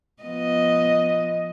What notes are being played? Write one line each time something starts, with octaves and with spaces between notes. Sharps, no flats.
F3 B3 D#5